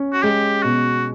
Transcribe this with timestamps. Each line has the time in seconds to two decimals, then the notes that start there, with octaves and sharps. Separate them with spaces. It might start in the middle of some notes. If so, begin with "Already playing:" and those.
Already playing: C#4
0.13 F#4
0.23 G#3 G4
0.63 B2 F#4